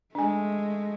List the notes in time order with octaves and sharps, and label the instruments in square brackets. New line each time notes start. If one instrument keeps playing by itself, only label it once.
[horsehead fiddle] G#3 A3 [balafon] D4 G#5